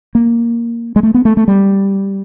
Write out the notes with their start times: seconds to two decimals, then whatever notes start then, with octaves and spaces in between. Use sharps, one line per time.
0.15 A#3
0.96 G#3
1.03 A3
1.14 B3
1.25 A3
1.37 A3
1.48 G3